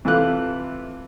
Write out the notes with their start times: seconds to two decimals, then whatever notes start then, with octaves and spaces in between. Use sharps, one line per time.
0.05 C3 E3 A3 F4 D6 F#6